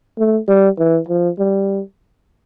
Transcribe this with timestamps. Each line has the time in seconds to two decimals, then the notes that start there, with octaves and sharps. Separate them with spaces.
0.18 A3
0.48 G3
0.78 E3
1.09 F3
1.39 G3